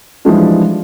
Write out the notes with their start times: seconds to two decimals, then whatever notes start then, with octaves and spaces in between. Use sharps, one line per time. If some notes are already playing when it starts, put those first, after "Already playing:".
0.25 E3 F3 G3 G#3 D4